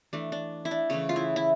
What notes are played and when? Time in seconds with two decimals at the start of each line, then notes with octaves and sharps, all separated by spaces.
0.13 E3 A3 D4
0.32 D4
0.65 E4
0.71 D4
0.90 C#3 E3 A3 C#4
1.09 F4
1.16 E4
1.36 E4